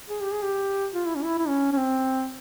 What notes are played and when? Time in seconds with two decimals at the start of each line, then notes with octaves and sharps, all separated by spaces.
0.08 G#4
0.22 G4
0.33 G#4
0.43 G4
0.93 F4
1.07 E4
1.16 C#4
1.24 E4
1.38 E4
1.48 C#4
1.73 C#4
1.77 C4